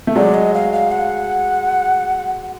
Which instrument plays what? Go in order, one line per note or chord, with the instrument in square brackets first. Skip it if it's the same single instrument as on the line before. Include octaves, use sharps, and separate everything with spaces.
[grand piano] A3
[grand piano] F#3 G#3 [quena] D5
[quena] D#5
F5
F5
F#5